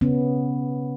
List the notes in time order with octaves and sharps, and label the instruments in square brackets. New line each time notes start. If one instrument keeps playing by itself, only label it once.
[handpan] C#3 B3 C#4